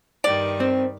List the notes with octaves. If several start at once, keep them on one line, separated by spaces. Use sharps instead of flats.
G2 D#3 G3 D5
C4